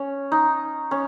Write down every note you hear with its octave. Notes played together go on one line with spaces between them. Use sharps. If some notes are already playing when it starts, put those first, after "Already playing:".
Already playing: C#4
D#4
C#4